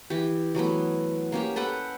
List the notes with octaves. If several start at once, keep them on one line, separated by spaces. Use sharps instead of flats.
E3 G4
E3 F#3 A3 B3
A#3 C#4 G4
A4 B4 F#5 G5